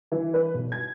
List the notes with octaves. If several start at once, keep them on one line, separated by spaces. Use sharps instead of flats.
E3
B4
B1
G#6